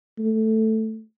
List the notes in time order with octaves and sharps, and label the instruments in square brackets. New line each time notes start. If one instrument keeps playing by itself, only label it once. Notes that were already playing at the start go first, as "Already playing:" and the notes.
[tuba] A3